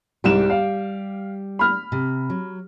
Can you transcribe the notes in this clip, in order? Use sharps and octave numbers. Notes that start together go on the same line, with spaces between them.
C2 G#2 G3 G4 E7
F5
B5 F6
C3
F#3